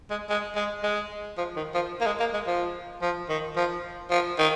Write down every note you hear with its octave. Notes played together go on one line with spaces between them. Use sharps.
G#3
G#3
G#3
G#3
F3
D#3
F3
A#3
G#3
A#3
G#3
F3
F3
D#3
F3
F3
D#3